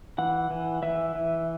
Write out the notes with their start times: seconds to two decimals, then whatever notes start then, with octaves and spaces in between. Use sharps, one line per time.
0.18 E3 F#5
0.51 E3
0.83 E3 E5
1.15 E3